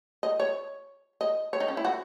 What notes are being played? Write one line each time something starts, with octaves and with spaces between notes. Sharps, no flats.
D#5
C#5
D#5
C#5
D#4
C#4
E4
F#4